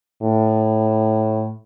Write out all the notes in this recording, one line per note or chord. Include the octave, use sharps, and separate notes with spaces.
A2